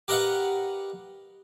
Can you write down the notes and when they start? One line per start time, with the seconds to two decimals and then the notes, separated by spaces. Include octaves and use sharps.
0.08 G4 A#4 B4 D#5 F5 F#5